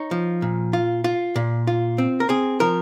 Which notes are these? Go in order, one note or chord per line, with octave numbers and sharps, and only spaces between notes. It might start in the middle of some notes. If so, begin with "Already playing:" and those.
Already playing: D#4 C#5
F3
A#2
F4
F4
A#2
F4
C4
A#4
C4 G#4
F3 A#4